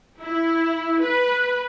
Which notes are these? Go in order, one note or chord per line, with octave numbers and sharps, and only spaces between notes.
E4
B4